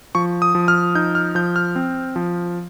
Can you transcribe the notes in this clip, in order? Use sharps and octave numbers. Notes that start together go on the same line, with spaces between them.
F3 C#6
D#6
F3
F6
D#4 G6
F6
F3 G6
F6
C4
F3